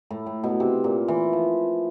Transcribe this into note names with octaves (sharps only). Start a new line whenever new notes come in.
A2
A2
B2
C3
A#2
E3
F3